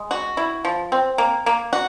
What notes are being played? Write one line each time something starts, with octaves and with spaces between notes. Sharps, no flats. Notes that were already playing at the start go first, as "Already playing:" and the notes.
Already playing: G#3
F#4
E4
F3
C4
A#3
A#3
F#4